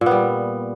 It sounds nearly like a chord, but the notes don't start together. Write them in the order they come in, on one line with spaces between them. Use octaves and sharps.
A#2 B3 G3